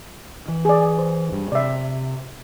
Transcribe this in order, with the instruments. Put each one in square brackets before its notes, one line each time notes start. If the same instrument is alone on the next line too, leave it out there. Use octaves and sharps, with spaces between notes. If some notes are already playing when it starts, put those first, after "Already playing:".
[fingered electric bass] E3
[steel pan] G#4 D5
C5
[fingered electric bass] G2
[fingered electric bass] C3 [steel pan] D5 E5